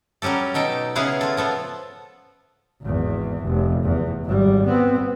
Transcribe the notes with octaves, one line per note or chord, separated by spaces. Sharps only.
F#3 G3 C#4 G4 A4
B2 D#4 A4 G5
C#3 B3 E4 G#4 F5 F#5
F4 A4
F3 B3 A4
G#1 E2
F1
E2
G#1 G3
B3 C4